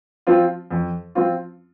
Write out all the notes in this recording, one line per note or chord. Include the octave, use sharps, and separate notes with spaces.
F3 C4 F4
F2
F3 C4 F4